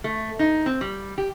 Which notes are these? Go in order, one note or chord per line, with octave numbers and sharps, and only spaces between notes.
A3
D#4
C4
G3
G4